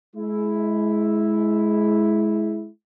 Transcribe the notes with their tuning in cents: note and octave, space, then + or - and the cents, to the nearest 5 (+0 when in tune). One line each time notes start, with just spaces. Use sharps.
G#3 +25 E4 +0